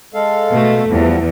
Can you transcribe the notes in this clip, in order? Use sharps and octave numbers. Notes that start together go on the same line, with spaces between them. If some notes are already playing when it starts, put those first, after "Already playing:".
G#3 A4 F5
B2 A3
E2 F3 G3 B3